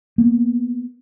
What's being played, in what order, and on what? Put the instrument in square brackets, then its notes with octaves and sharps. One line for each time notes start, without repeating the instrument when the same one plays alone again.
[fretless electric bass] A#3 B3